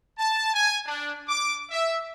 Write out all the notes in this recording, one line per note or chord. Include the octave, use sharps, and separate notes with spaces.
A5
G#5
D4
D6
E5